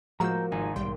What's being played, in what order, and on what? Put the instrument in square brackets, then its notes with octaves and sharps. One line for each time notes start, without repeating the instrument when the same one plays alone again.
[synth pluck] A2 G#3 E6 [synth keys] F3 F#4 [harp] A#3 [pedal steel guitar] A#5 G6
[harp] G#1 [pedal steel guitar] D#4 G#5
[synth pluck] B1 G3 G5 [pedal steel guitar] C6